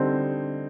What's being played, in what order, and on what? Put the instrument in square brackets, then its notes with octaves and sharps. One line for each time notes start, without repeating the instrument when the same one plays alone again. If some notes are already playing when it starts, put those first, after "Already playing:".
Already playing: [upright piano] D3 G3 C4 D#4